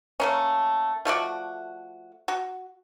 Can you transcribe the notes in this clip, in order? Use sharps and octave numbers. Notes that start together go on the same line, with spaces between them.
A3 A#3 C#4
F3 A3 F#4 D5
F#4